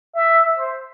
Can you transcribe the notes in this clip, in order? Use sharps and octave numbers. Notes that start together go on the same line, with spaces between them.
E5
C5